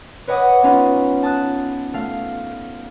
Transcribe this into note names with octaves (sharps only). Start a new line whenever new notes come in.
B4 C#5 D#5 F#5 D6 D#6
G#3 B3 C#4 D#4 F4
A5 D#6 F#6
A3 F5